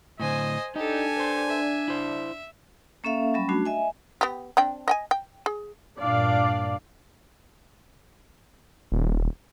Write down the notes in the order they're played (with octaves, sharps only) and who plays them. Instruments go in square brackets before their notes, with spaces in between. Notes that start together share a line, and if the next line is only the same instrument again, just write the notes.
[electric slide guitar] A2 D3 [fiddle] C5 G#5 [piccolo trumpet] D#5
[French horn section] D4 [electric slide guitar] D#4 D#5 [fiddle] G4 A4 [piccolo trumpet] G#5
[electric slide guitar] B4 C5
[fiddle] E5
[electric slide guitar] E4 C5
[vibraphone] A#3 C#4 A4 E5 F5
F#3 G3 C#4 B5
A3 D4 F#4
D#5 E5 G#5
[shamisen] B3 G4
C4 D4 G5
D#5 G5 G#5
G5
G#4
[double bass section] G2 A#2 [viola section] D4 D5 F5
[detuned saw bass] D#1